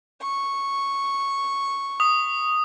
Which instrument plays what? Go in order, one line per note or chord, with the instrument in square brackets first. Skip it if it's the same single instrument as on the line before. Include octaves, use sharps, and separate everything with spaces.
[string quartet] C#6
[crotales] D#6